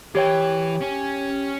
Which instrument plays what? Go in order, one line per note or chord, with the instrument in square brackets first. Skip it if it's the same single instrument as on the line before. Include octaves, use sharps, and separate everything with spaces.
[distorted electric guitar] E3 [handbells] G4 C#5 G5
[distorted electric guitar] C#4